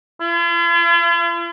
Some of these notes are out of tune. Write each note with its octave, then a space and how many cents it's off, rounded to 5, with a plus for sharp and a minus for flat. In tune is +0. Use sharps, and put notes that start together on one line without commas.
F4 -45